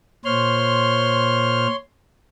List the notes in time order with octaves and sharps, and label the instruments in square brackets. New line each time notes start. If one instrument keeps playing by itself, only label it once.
[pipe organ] A#2 C5 F6 [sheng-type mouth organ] C#5 C6